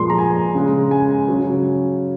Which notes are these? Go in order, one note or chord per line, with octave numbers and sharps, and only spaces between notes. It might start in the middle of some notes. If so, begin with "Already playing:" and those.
Already playing: A#2 F3 G#3 C6
A#5
G#5
C#3 G#3
G#5
C#3 F#3